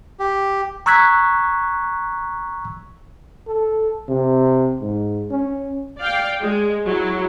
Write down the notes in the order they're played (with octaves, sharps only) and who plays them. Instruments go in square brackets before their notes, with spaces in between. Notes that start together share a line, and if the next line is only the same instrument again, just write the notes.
[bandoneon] G4
[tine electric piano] A#5 C#6 E6 F#6 G#6 B6
[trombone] A4
C3
G#2
C#4
[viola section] D5 F5 G5
G#3
F#3 E4